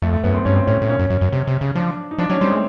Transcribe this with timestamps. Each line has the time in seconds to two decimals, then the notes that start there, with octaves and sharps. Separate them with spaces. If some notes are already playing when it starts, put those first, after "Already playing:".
0.02 F2 A3
0.13 A3
0.24 F#2 B3
0.34 C4
0.45 G2 C#4
0.56 C4
0.67 A2 C#4
0.82 A2
0.89 A#2 C#4
0.99 F#2
1.10 F#2
1.21 F#2
1.32 C3
1.47 C3
1.61 C#3
1.75 F3 D4
2.11 D#4
2.18 F3 D4
2.30 F#3 C#4
2.41 G3 C4
2.51 G#3 A3